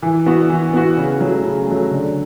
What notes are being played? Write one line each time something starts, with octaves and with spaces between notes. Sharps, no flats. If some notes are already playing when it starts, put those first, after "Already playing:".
E3
B3 F#4
E3
B3 F#4
C#3
F#3 A3
C#3
F#3 A3
D3